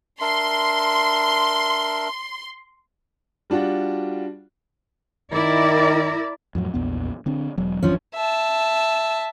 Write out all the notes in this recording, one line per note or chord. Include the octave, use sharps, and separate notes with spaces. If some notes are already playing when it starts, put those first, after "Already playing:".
D4 A#4 E5 C6
G3 D4 F4 F#4
D#3 E4 A#4 D5
F2 A2 F#3
A#1 E2 B3
D3 C4 D4
E1 F#3
G#1 F3 F#3 C#4 D4
E5 A5